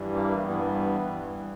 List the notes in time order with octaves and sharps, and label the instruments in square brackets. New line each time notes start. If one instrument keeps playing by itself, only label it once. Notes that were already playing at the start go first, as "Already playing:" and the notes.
Already playing: [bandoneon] G2 E3 G3
A#3
G2 E3 G3 B3
G2 E3 G3